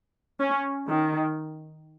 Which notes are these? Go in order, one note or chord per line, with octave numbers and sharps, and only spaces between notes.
C#4
D#3